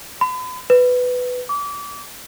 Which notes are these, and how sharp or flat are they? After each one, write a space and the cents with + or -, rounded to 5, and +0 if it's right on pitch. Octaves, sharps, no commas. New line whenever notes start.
B5 +40
B4 +10
D6 -30